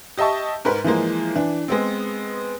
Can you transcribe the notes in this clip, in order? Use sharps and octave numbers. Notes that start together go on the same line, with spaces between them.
G4 D#5 E5 A5 C#6
G#2 A#4 B4
E3 F3 G#3 A#3
E3 D4
G#3 B3 C4